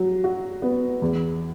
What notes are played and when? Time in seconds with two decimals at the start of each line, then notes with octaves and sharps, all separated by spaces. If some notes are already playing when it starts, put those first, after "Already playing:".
Already playing: F#3
0.24 F#4
0.62 B3
1.02 E2